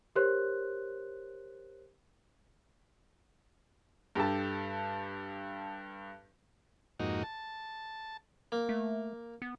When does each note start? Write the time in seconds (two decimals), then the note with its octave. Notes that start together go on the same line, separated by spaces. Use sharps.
0.16 G4 A#4 C5 C#5 C6 F#6
4.15 G2 G4 A4 A5
7.00 F2 G#2 A#3 D#4 F#4
7.23 A5
8.52 A#3
8.69 A3
9.42 B3